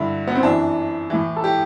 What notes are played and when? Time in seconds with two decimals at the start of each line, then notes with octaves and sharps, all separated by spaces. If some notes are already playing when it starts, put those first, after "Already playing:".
Already playing: G2 D3 E4
0.27 B3
0.35 C4
0.43 F#2 E3 D4
1.10 A2 E3
1.36 A4
1.44 G4